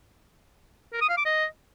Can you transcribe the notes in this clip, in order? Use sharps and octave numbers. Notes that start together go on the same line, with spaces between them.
A#4
D#6
F5
D6
D#5